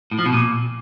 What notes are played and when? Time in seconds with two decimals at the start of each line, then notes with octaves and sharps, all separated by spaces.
0.11 A2
0.19 F3
0.26 B2
0.33 A#2